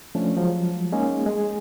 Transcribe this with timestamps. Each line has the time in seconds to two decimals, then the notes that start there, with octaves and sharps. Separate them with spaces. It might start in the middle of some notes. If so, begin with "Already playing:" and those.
0.15 F3 A3 C#4 D4
0.37 F3 F#3 G#3
0.93 G#3 A#3 C#4 D#4 G#4
1.26 G#3 G#4